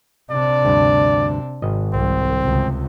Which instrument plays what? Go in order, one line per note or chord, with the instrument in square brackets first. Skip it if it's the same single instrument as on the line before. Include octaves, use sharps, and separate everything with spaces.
[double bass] C3 D4 [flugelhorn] D5
[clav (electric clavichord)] D2 G2
G#1 D#5
[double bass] C2 [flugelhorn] C4
[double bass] C#2 C3